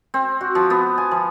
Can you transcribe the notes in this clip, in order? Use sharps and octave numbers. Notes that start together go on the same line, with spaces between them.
C4
F#4
F3
B3
G#5
F3